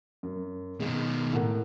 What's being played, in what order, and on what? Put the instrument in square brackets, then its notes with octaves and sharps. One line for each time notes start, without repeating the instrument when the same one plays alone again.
[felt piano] F#2
[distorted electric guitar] B2 D#3 [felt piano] G#3
[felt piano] A2 A#4 F#5